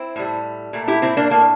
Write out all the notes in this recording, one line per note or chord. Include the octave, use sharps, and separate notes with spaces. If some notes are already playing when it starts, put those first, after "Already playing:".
Already playing: C4 E4
A2 G3
A#2 A3
E4 G4
C4 E4
A#3 D4
A2 F3 A3 A#3